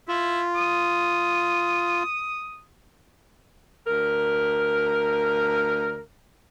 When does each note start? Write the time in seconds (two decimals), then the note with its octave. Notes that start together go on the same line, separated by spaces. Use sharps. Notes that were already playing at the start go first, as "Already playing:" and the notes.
0.08 E4 F4
0.56 D#6
3.87 D2 A#4